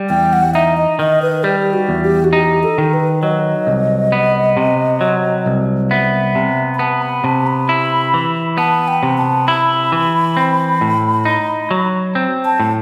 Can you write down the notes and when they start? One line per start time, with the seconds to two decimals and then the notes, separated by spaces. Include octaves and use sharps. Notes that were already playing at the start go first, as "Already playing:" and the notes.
Already playing: G3
0.09 E2 G5
0.33 F#5
0.54 D#4 E5
0.77 D#5
0.99 D#3 D#5
1.22 B4
1.43 G3 G4
1.73 F#4
1.89 E2
2.04 G4
2.24 F#4
2.33 D#4 G4
2.63 A4
2.78 D#3
2.93 B4
3.23 F#3 D#5
3.67 C2
4.12 B3
4.57 C3
5.01 F#3
5.46 C2
5.90 B3 E5
6.35 C3
6.75 B5
6.79 B3 A5
7.02 B5
7.24 C3 A5
7.47 B5
7.69 E4
8.14 E3
8.58 B3 A5
8.88 G5
9.03 C3
9.18 A5
9.47 E4 B5
9.92 E3
10.37 C4
10.81 A2
11.25 D#4
11.71 F#3
12.15 C4
12.45 A5
12.60 A2